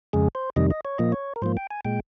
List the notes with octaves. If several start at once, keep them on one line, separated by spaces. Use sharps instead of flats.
F2 C#3 G#3 G#4
C5
F2 C3 D#3 G3 D#5
D#5
C#5
A#2 F3 A#3 D#5
C#5
A#4
G#2 F3 A#3 C5
G5
G#5
A#2 G#3 G5